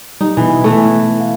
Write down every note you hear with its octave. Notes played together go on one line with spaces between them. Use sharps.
G3 D#4
B2 E3 B3
E3 A3
F5